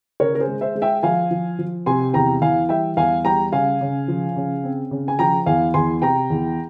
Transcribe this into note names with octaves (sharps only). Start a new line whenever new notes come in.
C#3 A#4 C#5
A#4
G#4 C5
G#3
C5 E5
G#3
E5 G5
F3 F5 G#5
F3
F3
C3 G#5 C6
E2 G5 A#5
E3 F5 G#5
G3 E5 G5
E2 F5 G#5
G3 G5 A#5
C#3 F5 G#5
C#3
F3
C#3
C4
C#3
G#5
F3 G5 A#5
E2 F5 G#5
E2 G#5 C6
C3 G5 A#5
E2